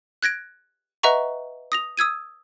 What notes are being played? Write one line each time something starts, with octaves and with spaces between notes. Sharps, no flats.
F#6 G#6 A#6 D7
B4 D#5 E5 F#5 A#5 C#6
D#6 A#6 F7
D#6 E6 G#6 D#7